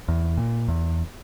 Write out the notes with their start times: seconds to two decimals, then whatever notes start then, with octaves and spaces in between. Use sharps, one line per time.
0.08 E2
0.37 A#2
0.68 E2